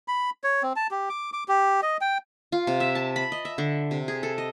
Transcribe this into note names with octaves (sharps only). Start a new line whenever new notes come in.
B5
C#5
C4
A5
G4
D6
D6
G4
D#5
G5
F4
C3
E5
A5
B5
D#5
E5
D3
C3
G#4
A4
D#5